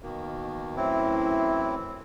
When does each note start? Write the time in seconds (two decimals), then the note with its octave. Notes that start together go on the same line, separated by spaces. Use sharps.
0.02 B2 D#3 A#3
0.76 F#2 A2 E3 C4 E4